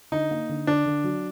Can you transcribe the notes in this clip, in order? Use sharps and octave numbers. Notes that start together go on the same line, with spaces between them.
D3 D#4
A#3
D3
D3 D4
D3
F#3